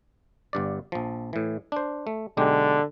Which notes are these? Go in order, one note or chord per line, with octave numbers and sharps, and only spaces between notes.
G1 G2 D5
A#1 F3
A2 E3
D4 C5
A3
B1 D3 G#3 G4